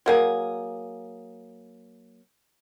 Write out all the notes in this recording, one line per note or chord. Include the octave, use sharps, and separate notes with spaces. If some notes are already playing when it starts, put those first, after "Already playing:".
F#3 A#3 G#4